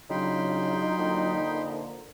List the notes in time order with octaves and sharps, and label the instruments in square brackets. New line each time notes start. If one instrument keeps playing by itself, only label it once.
[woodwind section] C#3 [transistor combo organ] F#3 D4 F4 [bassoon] D#4 [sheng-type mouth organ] G5 B5 C6
[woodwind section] D3 F3 A#3